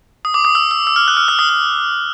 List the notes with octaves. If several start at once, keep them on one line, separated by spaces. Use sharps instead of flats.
D#6
D6
D#6
E6
E6
E6
F6
F#6
F6
E6
D#6
D#6